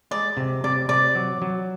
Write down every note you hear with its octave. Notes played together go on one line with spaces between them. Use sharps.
G#3 D5
C3
C3 D5
C3 D5
F#3
F#3